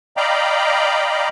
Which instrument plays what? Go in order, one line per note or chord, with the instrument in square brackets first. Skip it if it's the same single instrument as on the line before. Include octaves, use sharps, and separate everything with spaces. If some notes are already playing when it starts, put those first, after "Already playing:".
[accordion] D5 D#5 F5 G5 A#5 B5